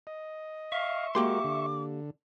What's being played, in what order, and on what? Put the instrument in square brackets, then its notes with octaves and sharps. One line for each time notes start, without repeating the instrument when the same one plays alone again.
[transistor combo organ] D#5
[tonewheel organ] E5 C#6 [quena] F5
[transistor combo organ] G#3 F#4 A#4 [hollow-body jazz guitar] A#3 G4 C6 [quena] D6
[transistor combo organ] D3